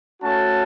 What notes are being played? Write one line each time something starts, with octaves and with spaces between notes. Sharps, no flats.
A3 C#4 F#4 A5